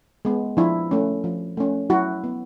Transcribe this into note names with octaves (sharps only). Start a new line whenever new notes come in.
G#3 B3
F3 D4 E4
A3 C#4
F3
A3 C#4
F#3 E4 F#4
B3